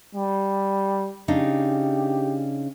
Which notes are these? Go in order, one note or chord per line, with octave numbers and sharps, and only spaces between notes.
G3
C#3 D4 D#4 G4